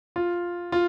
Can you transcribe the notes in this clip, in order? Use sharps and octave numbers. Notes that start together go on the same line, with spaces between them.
F4
F4